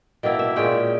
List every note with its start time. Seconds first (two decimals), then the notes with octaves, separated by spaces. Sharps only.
0.23 B2 A#3 E4 G5
0.39 E5
0.56 A#2 G#3 C#4 G5